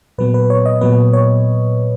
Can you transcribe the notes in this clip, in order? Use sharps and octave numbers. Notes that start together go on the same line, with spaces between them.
A#2 F#3 B3 B4
B4
C#5
D#5
A#2 F#3 B3 B4
C#5